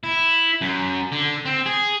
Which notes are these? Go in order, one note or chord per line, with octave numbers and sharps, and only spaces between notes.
E4
F#2
D3
C4
G#4